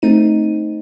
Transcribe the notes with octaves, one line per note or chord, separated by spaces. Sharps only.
A3 C4 D#4 D#7